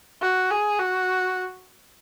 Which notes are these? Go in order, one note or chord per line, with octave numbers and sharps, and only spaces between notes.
F#4
G#4
F#4